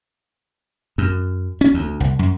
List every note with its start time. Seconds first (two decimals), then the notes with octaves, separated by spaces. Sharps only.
0.98 F#2
1.61 C#4
1.74 D2
2.00 C2
2.19 F#2